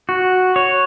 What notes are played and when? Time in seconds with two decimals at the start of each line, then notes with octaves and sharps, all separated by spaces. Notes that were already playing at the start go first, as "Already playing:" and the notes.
0.09 F#4
0.56 C#5